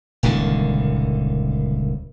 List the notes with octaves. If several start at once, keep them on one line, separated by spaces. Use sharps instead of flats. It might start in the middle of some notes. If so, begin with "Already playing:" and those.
D#1 C#2 D3 D#3